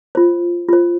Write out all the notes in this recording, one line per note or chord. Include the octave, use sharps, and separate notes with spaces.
F4 C5
F4 C5